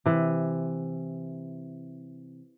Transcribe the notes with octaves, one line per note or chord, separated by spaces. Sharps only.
C3 E3